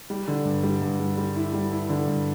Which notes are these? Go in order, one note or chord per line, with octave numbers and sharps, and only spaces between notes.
G3
D3
G2
G3
G2
G3
G3
E4
G3
E4
D3
G2